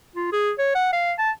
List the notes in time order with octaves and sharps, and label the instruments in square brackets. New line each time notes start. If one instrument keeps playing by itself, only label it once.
[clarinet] F4
G#4
C#5
F#5
F5
A5